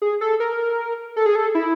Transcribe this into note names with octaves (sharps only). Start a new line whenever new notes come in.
G#4
A4
A#4
A4
G#4
A4
E4